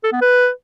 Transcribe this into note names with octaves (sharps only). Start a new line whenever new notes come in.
A4
B3
B4